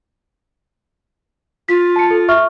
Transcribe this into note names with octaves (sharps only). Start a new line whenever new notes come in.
F4 B6
A5 C#7
A4
E5 C#6 F6